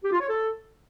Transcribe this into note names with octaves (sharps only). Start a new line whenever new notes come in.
G4
F4
C#5
A4